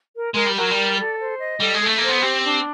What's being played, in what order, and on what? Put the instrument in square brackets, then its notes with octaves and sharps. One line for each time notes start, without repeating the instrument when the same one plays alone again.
[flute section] A#4
[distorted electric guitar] G#3 [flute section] A#4
[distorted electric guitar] G3
[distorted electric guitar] F#3 [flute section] A#4
[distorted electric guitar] G3
[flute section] D5
A4
C5
D#5
[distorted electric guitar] G3 [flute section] A4
[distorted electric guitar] G#3
[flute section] A4
[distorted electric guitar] A3
[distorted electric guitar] A#3 [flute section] C5
[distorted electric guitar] B3
[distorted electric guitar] C4 [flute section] G4
[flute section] D4